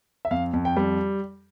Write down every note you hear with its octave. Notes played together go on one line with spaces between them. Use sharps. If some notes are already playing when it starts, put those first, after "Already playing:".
E5
F2 F5
F2
G5
G3